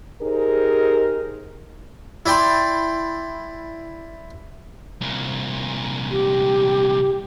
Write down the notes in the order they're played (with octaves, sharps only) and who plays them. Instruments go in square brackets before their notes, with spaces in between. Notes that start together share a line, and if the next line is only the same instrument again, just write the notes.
[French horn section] D#4 G4 G#4 A#4 C5
[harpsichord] E4 D5 G5 C6
[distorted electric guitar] C2 A#2
[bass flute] G4